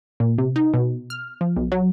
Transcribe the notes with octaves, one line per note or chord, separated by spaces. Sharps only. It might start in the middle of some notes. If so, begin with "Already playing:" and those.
A#2
C3
D#4
B2
F6
F3
B1
F#3